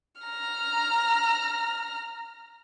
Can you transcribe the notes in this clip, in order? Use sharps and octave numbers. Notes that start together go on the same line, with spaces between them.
A#5 F6